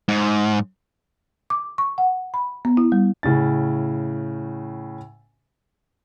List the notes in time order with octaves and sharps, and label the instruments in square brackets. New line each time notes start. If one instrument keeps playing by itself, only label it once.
[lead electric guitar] G#2
[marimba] D6
C#6
F#5
B5
B3
E4
G3
[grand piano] A2 C#3 C#4 A6